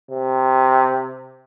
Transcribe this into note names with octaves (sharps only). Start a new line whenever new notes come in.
C3